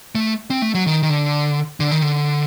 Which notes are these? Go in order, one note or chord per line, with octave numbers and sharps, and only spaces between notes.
A3
C4
A3
F#3
D#3
D#3
D3
D3
D#3
D3